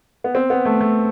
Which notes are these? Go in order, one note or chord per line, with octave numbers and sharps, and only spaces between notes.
B3
C4
B3
A3
A3